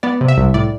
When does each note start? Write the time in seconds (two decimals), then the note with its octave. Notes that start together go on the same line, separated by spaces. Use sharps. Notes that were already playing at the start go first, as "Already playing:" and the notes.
0.03 B3 D5
0.21 C3
0.28 E5
0.37 C2
0.54 A2 D5